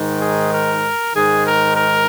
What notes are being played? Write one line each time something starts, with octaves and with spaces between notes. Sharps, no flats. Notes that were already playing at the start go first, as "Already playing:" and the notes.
Already playing: G#2 D#3
G#4
A#4
G#2 D#3 G#4
A#4
A#4